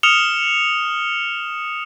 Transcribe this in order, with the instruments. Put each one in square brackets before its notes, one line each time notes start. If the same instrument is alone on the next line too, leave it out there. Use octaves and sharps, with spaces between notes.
[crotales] D#6 F6 C#7 E7 F7 G7